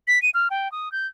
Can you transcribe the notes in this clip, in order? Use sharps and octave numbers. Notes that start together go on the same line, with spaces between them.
B6
D#7
F6
G5
D#6
G6